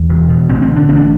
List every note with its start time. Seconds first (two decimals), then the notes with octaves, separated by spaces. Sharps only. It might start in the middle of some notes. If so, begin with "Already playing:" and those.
Already playing: E2
0.09 E1
0.29 B2
0.49 A1 C4
0.62 C4
0.69 D3
0.76 D4
0.89 A1 C4
0.96 D4